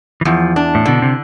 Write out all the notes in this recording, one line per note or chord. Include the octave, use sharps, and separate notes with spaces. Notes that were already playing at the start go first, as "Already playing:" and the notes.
E3
E2 F3
D4
A2
B2 D3
C3